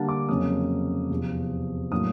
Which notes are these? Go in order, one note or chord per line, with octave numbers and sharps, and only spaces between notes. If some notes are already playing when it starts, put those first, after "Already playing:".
Already playing: D3 G3 A#3 D4 F#5 A5
D6
F2 C#3 F#3 A#3 C#4 D#6
E2 C3 F3
A2 F#3 A#3 D4 D#6